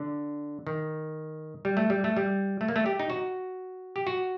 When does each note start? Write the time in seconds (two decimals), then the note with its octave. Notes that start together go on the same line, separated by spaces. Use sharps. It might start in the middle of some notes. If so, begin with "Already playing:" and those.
Already playing: D3
0.67 D#3
1.65 G3
1.77 A3
1.90 G3
2.04 A3
2.17 G3
2.61 A3
2.69 A#3
2.76 A3
2.86 G4
3.00 D#4
3.10 F#4
3.96 G4
4.07 F#4